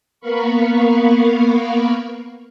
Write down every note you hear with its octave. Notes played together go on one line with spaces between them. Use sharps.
A#3 B3 A#4 F5 B5 C#6